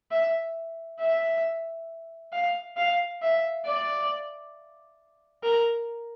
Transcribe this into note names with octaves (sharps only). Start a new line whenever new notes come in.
E5
E5
F5
F5
E5
D5
A#4